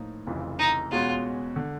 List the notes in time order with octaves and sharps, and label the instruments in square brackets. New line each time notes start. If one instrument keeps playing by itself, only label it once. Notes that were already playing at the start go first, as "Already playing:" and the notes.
Already playing: [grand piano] A2 F3 A#3 D#4
F1 F2 C#3 E3
[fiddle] D#4
[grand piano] E2 B2 G#3 C#4 F#4 [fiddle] F4
[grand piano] D3